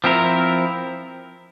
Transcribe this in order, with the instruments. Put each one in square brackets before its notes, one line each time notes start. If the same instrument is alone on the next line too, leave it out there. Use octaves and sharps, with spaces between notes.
[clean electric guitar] F3 C4 E4 A#4